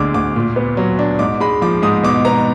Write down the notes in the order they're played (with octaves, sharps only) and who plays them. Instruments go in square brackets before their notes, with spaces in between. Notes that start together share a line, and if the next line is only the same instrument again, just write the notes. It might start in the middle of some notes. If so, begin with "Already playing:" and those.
Already playing: [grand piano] D2 D3 G#3 D6 G#6
D2 D6
A#2
B3
F#3
D4
G#2 D6
G#3 B5
F3 D6
G#2 D#6
B2 D6
B3 A#5